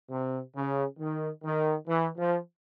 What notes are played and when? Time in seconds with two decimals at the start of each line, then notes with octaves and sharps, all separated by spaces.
0.10 C3
0.56 C#3
1.00 D#3
1.44 D#3
1.88 E3
2.18 F3